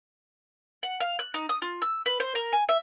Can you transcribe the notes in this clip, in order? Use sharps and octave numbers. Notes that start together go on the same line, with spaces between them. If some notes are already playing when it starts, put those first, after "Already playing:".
F#5
F5
F#6
D#4
D#6
F4
E6
B4
C5
A#4
G#5
E5